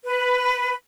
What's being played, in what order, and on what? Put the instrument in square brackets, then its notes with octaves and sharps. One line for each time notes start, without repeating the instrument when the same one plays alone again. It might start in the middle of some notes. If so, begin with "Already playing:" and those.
[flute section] B4